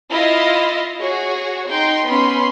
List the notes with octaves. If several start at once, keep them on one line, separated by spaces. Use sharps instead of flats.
E4 F4 D#5 F5
F#4 G#4 C#5
D#4 G5 C6
B3 C#4 B5 C6